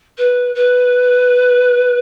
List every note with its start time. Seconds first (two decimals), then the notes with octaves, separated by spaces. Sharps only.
0.18 B4
0.55 B4